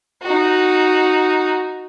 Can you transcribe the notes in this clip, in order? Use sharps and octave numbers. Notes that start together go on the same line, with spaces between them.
D#4 F#4